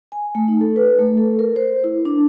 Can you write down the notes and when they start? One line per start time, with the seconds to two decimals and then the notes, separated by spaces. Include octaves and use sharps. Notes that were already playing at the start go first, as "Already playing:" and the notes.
0.12 G#5
0.35 A3
0.48 D#4
0.61 A4
0.76 B4
0.99 A3
1.17 A4
1.39 A#4
1.56 C5
1.84 E4
2.05 D4